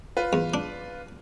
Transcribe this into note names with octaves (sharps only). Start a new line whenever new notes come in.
F4 B4
E2
D4